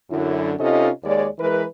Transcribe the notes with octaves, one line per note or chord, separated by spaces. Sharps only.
F#2 D3 E4
C3 C#4 D#4 F4 A4 D#5
D#2 G#3 C#5 D5
E3 G#3 A#4 B4